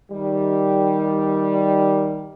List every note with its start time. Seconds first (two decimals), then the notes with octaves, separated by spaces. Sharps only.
0.11 D#3 G3